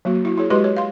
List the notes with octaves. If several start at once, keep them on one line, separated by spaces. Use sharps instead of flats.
F#3 A#3 F#4
E4 F#4
E4 G#4 C#5
G#3 F#4 G4 B4 D#5 C6
C#5
F5 C6